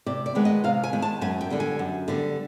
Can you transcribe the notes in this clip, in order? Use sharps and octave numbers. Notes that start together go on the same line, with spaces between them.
C3 D5
D5
D#3 G#3 B3
D#5
C3 F5
G#5
D#3 G#3 B3
A5
F#2 G#5
G5
D3 G3 B3
G#5
F#2
D3 G3 B3